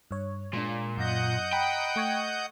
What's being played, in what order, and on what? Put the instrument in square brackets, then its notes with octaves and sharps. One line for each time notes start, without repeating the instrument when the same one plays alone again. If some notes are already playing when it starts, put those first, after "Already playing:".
[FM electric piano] G2 C#5
[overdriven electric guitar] A#2 [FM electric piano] G#3 D4
[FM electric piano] F#2 A#6 [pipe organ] D#5 F#5 G6
[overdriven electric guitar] G5 [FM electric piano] A#5 B5
[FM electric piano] A3 C#6 G#6